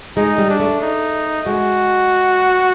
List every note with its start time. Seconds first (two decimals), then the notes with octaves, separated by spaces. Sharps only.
0.17 G#3 D#4
0.38 G3
0.49 D4
0.60 A3
0.82 D#4
1.47 G#3 F#4